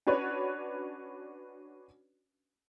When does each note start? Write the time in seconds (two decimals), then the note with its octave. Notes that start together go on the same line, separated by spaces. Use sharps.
0.07 C#4 D4 F#4 B4 C#5 D5